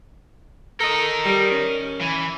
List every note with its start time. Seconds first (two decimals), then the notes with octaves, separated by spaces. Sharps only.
0.80 A4 A#4 D#5
1.26 G3
1.51 C#4
2.01 E3